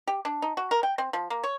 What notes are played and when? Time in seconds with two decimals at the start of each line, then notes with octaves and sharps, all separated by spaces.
0.07 G4
0.25 D4
0.42 D#4
0.57 F#4
0.71 A#4
0.83 G5
0.98 C4
1.13 F3
1.30 A#3
1.44 C#5